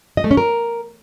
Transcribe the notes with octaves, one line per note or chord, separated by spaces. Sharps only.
D#5
A3
C#4
A#4